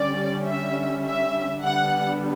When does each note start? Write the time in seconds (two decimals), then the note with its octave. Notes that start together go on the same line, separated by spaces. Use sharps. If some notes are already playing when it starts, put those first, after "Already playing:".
Already playing: D3 G3 C#4 D5
0.47 E5
1.05 E5
1.63 D3 G3 B3 D4 F#5